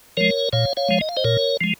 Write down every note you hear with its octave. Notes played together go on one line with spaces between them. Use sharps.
F3 G#3 A#4 C#5
A#2 C#5 F5
C#5 F5
F3 G#3
D#5
F5
C5 D#5
A#2 A#4 C#5
F3 G#3